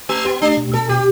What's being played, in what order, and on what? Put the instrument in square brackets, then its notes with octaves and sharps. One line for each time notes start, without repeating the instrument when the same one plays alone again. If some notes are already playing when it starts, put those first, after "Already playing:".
[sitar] A3 [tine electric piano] G4
[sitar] B3 [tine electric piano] G4
[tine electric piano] A3 [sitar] D4
[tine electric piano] B2
[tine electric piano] B2 [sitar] A4
[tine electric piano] B2 [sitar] G4